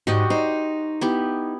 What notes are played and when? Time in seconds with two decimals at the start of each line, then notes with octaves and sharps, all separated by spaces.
0.07 G#2 F#4 G4 D#5
0.30 D#4 C5
1.01 B3 E4 G4